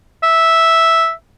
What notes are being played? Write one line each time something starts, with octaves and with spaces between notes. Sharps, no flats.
E5